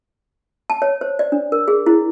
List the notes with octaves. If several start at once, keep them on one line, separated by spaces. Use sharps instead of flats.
A5
C#5
C5
D5
D4
A#4
G#4
E4